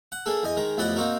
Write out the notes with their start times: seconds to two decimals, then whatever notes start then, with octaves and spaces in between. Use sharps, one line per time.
0.12 F#5
0.26 A#3 D4 G#4 A4
0.43 E2 D#5 G#5
0.57 D#3 G#3 A#4
0.78 A1 F2 B3 D5 D#5 F#5
0.96 A#3 C4 D#4 F#4 A#4